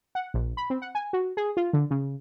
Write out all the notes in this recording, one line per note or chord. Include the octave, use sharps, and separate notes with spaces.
F#5
A#1
B5
C4
F#5
G#5
F#4
G#4
F4
D3
C#3